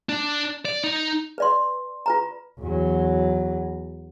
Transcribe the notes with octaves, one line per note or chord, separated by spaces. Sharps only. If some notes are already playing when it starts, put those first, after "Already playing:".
D4
D5
D#4
B4 D5 C6
F4 B4 A#5
E2 F#3